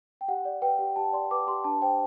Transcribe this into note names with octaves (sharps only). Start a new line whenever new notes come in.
G5
G4 F#5
D5
B4 G5
G4
G4 A5
D5 C6
B4 D6
G4 C6
D4 A5
C5 G5